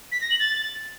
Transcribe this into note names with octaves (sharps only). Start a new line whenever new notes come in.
B6
A#6
F#7
A6